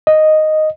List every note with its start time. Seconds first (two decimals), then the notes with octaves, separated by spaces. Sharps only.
0.07 D#5